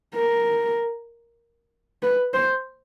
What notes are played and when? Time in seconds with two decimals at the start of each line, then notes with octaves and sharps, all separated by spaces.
0.15 A#4
2.03 B4
2.34 C5